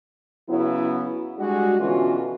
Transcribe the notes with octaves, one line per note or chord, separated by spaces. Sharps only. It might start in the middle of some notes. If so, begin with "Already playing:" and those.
C#3 F#3 B3 E4
G3 G#3 D4 F#4
B2 D3 E3 C#4 F4 F#4